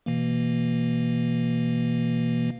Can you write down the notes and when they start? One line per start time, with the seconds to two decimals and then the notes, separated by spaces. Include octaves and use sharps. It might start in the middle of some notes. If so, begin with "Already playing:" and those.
0.06 B2 E3 A#3